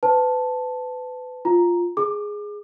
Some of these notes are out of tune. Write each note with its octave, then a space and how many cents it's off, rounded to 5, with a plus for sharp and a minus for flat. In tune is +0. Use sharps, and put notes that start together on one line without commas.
B4 +30 A5 +0
F4 +0 A#5 +0
G#4 +0 D6 +30